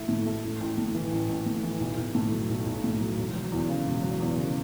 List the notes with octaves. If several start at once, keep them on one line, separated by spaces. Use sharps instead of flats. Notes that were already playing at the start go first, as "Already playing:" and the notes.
Already playing: A1 A3 E4
A2
A3
A1
A1
A2
E3
A1
A1
A2
E3
B1
B1
A2
F#3
B1
B1
A2
F#3
E1
F#3
E2
C#3
E1
F#3
E2
C#3